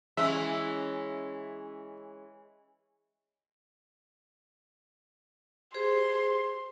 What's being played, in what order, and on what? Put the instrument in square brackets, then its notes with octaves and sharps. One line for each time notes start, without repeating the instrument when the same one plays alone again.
[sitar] E3 G#3 C#4 [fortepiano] E5
[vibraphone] G4 G#4 C5 [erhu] C6